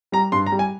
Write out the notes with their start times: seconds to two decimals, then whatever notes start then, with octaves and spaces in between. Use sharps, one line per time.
0.12 G3 A#5
0.32 G2 C6
0.46 A#5
0.52 G3
0.59 G#5